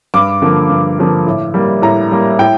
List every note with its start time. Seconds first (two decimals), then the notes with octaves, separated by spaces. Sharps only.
0.14 G2 D6
0.42 D3 F3 A#3
0.70 G2
0.98 D3 F3 A#3
1.27 A2
1.54 G3 A#3
1.82 A2 A#5
2.11 G3 A#3
2.39 A2 G5